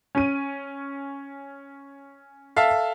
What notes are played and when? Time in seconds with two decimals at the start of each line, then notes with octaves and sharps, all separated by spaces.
0.15 C#4 D#7
2.56 A4 E5 F5 A5